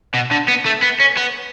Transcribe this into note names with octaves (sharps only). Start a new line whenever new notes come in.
B2
D3
B3
A3
B3
C#4
B3